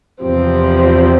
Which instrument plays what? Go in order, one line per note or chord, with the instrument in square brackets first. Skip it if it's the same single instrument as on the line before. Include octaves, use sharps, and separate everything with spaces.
[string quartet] E2 C3 F3 C4